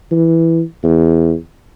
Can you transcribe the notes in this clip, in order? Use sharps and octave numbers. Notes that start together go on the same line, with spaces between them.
E3
E2